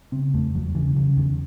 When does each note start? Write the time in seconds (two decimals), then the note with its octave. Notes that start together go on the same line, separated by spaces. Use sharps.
0.12 C#3 C4
0.34 E2 A3
0.55 E2 F#3
0.75 C#3 E3
0.95 C#3 F#3
1.16 E2 D#3